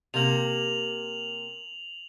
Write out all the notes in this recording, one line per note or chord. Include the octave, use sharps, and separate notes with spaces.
C3 A#3 F7 F#7